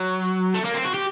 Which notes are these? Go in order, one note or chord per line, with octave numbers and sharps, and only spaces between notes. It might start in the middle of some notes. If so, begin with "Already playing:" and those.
Already playing: F#3
A3
A#3
C4
F#4
G4